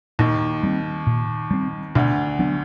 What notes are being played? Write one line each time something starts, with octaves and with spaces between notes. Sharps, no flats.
D#2 A#2 D#3
G3 C4
A#2
G3 C4
D2 B2 D3
F#3 B3 D4